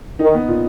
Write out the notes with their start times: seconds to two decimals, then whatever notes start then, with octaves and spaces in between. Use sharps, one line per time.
0.19 D#3 D#4
0.34 B3
0.48 A#2